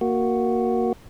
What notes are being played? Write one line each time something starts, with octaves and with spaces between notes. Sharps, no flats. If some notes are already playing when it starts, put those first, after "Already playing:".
A#3 F#4